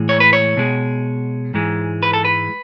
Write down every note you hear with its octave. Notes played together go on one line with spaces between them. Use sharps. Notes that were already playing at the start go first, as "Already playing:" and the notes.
Already playing: A2 E3 G#3
C#5
B4
C#5
B2 G#3
G#2 E3 G#3
B4
A4
B4